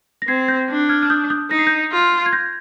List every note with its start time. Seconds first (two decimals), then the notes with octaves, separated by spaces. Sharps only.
0.22 A#6
0.28 C4 G#6 C7
0.48 G6 A#6
0.70 D4
0.89 F6 G#6
1.03 F6
1.10 D#6 G6
1.30 D#6 G6
1.50 D#4 A#6
1.59 C7
1.67 G6 A#6
1.92 F4
2.26 G#6
2.33 G6 A#6